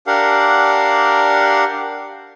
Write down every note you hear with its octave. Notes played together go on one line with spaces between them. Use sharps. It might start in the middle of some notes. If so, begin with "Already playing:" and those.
D4 G4 A#4 F5 F#5